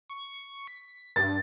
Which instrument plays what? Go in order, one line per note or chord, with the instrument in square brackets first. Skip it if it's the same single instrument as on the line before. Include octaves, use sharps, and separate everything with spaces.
[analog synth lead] C#6
B6
[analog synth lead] G2 [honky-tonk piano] A6